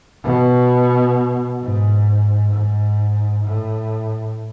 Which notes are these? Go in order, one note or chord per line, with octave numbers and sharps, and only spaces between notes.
B2
G#2
G#2
A2